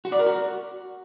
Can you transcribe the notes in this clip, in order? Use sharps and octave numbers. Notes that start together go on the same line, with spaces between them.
F#4
D5
A#4
F#4